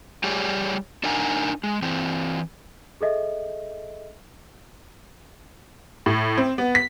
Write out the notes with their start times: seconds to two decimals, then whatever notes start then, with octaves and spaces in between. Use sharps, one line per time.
0.24 G3 G4 G#4 C#5 D5
1.03 D4 D#4 A#4 F#5 G#5 A#5
1.64 G#3
1.82 E3 C4
3.01 G#4 A4 D#5 E5
6.06 A2
6.37 C4
6.58 B3
6.75 B6